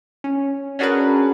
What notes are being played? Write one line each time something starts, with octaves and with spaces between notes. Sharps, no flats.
C#4
C#4 D4 F#4 G#4 A#4 B4